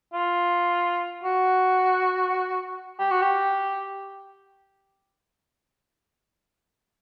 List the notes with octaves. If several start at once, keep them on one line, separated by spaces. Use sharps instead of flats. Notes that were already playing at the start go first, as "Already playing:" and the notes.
F4
F#4
G4
F#4
G4